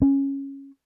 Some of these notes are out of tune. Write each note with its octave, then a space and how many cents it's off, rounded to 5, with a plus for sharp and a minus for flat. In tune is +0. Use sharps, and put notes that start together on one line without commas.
C#4 -10